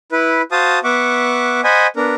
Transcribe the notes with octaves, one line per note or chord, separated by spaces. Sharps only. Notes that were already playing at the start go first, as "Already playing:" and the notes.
E4 B4
F#4 C5 F5 A5 D#6
B3 E5 F#5 C#6 D6
C5 D#5 F#5 G#5 B5
B3 D4 A#4